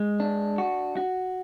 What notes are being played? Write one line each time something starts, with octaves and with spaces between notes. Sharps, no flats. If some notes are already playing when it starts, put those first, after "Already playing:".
Already playing: G#3
D4
F#4
F#4